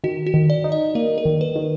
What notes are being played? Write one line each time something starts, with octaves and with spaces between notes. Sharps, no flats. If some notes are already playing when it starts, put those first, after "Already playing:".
D#3 F#4
F#4
D#3
D5
D#4
D#5
A#3 A#4
A#4
D#3
B4
D#3